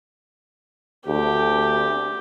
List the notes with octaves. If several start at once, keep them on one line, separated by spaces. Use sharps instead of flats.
D2 G4